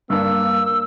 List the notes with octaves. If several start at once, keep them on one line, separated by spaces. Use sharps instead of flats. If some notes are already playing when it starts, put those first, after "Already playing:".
G2 A#3 D4 E6